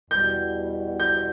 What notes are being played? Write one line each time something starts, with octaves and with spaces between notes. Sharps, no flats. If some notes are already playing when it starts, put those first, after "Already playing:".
E2 B2 G3 G6
G6